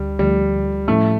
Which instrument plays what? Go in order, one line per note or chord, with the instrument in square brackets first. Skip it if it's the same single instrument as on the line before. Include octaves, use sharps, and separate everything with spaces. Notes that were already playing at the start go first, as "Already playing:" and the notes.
Already playing: [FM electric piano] D2 D3 [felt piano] G3
[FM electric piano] D2 D3 F3 A3 [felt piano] G3
[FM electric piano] A2 F3 C#4 E4 [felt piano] A3